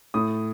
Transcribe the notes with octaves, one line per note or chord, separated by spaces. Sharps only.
A2 D#6